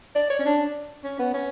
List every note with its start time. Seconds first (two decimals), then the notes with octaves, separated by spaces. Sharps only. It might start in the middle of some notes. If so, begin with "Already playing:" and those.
0.16 D5
0.30 C#5
0.40 C#4
0.46 D4
1.04 C#4
1.19 B3
1.34 C#4